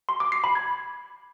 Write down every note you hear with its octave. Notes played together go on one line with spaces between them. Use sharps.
C6
D6
C7
B5
G#6